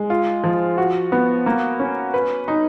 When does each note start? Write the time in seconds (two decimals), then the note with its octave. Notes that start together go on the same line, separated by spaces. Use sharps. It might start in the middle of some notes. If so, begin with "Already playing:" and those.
Already playing: G#3
0.10 F4
0.44 F3
0.78 F#4
1.12 B3
1.46 A#3
1.79 C#4
2.14 B4
2.48 D#4